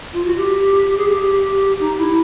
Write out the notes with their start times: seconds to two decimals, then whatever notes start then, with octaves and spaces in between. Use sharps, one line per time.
0.13 F4
0.25 F#4
0.36 G4
0.97 G#4
1.08 G4
1.79 D#4
1.97 E4